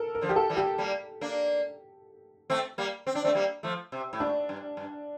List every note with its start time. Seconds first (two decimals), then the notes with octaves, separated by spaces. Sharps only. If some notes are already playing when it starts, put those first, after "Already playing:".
Already playing: A4 A#4
0.15 A#4
0.21 D3 F3
0.29 G4
0.36 A4
0.50 E3 G3
0.57 G4
0.78 G3 A#3
1.21 A#3 D4
2.50 A3 C4
2.78 G3 A#3
3.07 C4
3.15 D4
3.24 A3 C4
3.35 G3 A#3
3.63 F3 A3
3.92 C3
4.13 A2
4.20 A#2 D4
4.49 G2
4.77 G2